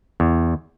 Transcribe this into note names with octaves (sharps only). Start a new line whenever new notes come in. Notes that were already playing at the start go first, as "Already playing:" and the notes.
E2